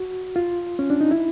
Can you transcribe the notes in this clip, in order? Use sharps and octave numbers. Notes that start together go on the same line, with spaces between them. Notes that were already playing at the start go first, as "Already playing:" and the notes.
Already playing: F#4
F4
C#4
D4
D#4
E4